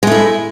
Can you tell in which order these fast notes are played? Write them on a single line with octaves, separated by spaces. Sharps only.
G#3 A3 E4